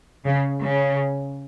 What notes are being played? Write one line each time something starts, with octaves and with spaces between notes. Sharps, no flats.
C#3
C#3